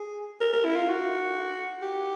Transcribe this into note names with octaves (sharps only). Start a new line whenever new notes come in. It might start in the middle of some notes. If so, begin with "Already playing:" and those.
Already playing: G#4
A#4
A#4
E4
F4
F#4
G4